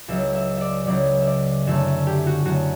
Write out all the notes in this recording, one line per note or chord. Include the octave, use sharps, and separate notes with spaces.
C#2 C#3 F#3 E5
E5
D5 E5
C#2 C#3 F#3 D5
E5
D5
F#2 D3 A3 E5
E5
G4
F#4
F#2 D3 A3 F#4